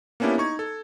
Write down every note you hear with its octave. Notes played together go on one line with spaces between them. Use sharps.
A#3 B3 C#4 D4 E4 G4
D#4 C#6 G#6
A4